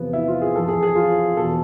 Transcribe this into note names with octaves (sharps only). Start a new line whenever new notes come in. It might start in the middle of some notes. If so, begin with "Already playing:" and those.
Already playing: E2 C3 F3 B3
E4
F4
G#4
F2 E3 A4
G#4
G#4
F4
E2 B2 A4